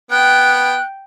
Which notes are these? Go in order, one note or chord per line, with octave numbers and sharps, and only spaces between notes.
B3 G5 F#6